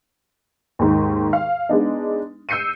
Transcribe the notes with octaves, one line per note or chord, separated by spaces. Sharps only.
D#2 G#2
F5
G#3 B3 D4 D#4
E6 G6 C7 C#7 D#7